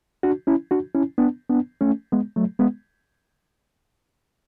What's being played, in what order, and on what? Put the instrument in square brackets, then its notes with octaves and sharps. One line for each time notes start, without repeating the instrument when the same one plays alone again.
[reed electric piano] D4 F#4
C#4 E4
D4 F#4
C#4 E4
B3 D4
B3 D4
A3 C#4
G#3 B3
F#3 A3
G#3 B3